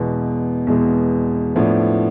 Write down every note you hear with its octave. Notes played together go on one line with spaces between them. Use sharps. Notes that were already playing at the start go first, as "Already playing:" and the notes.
Already playing: E2 B2 G#3
E2 B2 G#3
A2 F3 B3 D4